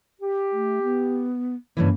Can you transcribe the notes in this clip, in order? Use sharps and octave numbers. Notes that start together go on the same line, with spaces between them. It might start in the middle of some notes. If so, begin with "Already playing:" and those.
G4
A3
B3
G2 C#3 E3 A#3